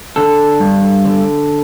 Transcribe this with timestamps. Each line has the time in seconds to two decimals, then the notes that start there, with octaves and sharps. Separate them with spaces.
0.16 D3 A4
0.60 G2
1.05 D3